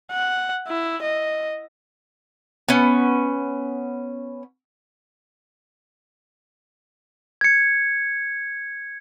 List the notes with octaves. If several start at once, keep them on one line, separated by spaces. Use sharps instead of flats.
F#5
E4
D#5
B3 C#4
G#6 C#7